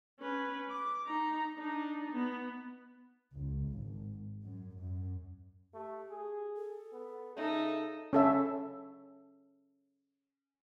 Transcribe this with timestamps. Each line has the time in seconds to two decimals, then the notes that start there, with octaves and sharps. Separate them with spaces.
0.20 C#4 B4
0.70 D6
1.07 D#4 A#5
1.57 D4 D#4
2.12 B3
3.36 C#2
3.70 G#1
4.45 F#2
4.81 F#2
5.74 A3 G4
6.10 G#4
6.56 A4
6.93 B3
7.37 C#3 D#4 A4 E5
8.13 C#4 A4 E5